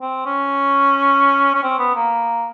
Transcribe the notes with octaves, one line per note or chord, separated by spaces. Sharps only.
C4
C#4
C#4
C4
B3
A#3